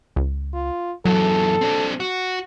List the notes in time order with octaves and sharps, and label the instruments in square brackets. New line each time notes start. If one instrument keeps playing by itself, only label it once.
[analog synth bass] C#2
[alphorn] F4
[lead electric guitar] F#2 E3 [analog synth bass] F#3 [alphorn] A4
[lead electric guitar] C4 D4
F#4